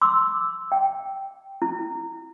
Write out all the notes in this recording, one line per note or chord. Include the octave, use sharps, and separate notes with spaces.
C6 D6 E6
G5
E4